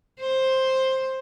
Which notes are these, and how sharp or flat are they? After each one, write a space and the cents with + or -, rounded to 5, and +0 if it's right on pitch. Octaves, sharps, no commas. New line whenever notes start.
C5 +10